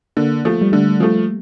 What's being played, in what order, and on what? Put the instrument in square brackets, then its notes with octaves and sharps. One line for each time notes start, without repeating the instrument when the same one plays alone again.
[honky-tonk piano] D3 [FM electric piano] A#3
[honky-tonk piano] F3 A3
[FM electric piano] G3
[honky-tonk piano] D3 [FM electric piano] A3
[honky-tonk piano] F3 A3